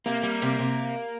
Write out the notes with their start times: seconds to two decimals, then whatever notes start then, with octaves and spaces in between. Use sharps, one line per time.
0.06 C3 A#3
0.23 G3
0.42 C3
0.59 C3